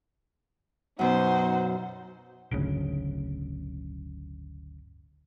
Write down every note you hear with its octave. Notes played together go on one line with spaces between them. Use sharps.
F#2 B2 D#4 C5 F#5
D1 G1 D2 C#3